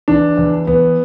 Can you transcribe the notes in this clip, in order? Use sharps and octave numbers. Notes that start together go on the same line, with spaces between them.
E2 D4
E2
E2 B3